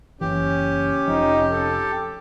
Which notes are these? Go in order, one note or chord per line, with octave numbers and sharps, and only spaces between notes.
F#1 E3 C#4 G4
F1 F3 D#4
A4